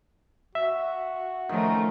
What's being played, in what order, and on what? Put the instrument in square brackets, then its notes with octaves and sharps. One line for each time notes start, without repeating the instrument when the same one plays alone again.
[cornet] F#4 [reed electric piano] E5
[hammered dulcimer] D#3 C#4 [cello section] F3 A3 A#4